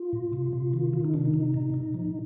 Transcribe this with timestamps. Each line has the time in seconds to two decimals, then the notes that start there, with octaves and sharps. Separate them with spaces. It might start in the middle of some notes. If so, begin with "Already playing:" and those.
Already playing: F4
0.13 A#2
0.33 C3
0.53 C3
0.73 D#3
0.93 D#3 F4
1.04 D#4
1.14 C3 D4
1.25 D#4
1.34 C3
1.54 A#2
1.74 A#2
1.94 F3